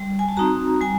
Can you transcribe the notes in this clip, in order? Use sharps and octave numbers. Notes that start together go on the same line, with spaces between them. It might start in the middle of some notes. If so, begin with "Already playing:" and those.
Already playing: G3
G#5
A5
C4 D#4 F#4 A#5
G3 G#5